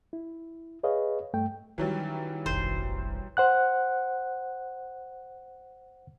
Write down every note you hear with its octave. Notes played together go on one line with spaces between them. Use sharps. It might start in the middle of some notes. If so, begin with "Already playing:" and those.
E4
G#4 B4 C#5 D#5 F5
G2 A3 G5
D#3 E3 F#3 G3 C#4
F1 A#1 C5
C5 F#5 F#6